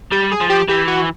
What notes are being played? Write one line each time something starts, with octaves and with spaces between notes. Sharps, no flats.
G3 G4
G#4
F3
G4
E3 G4
F#4